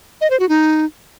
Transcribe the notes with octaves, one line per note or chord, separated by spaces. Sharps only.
D#5
C5
F#4
D#4